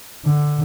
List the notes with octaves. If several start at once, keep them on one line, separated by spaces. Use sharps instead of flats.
D3